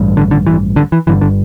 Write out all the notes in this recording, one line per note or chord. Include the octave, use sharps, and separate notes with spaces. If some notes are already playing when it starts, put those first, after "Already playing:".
Already playing: A1 G2
D3
D3
E3
D3
E3
G1 G2 D3 E3
D3